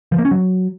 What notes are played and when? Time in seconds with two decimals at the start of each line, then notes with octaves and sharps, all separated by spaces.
0.12 F3
0.18 A#3
0.25 C#4
0.31 F#3